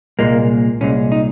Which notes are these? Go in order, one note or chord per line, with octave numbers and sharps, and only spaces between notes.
C2 A#2 G#3 A#3
C2 A#2 G#3 C#4
D#4